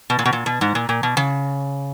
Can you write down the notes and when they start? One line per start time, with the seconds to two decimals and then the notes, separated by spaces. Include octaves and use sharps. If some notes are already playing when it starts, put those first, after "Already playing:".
0.10 B2
0.19 A#2
0.25 B2
0.33 A#2
0.46 B2
0.61 G#2
0.75 A#2
0.89 A#2
1.03 B2
1.17 C#3